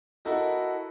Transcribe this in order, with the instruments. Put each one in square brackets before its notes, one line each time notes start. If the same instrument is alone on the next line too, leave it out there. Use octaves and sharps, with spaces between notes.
[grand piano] E4 F#4 A4 A#4 D#5